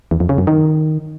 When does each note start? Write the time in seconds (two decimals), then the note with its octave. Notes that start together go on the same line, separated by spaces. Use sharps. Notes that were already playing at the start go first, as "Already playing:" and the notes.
0.11 E2
0.20 F2
0.29 C#3
0.38 F#2
0.47 D#3